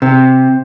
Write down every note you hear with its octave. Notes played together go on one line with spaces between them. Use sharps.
C3